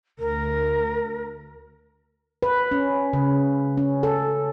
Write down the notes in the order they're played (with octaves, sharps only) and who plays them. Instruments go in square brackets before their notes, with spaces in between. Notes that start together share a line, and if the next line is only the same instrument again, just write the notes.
[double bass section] D2 [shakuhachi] A#4
[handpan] B4
C#4
C#3
C#4
A4